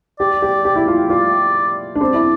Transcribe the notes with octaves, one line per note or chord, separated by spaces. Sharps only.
G4 D5
G4
G4
E4
F4
F4 D5
D4
C4 D5
E4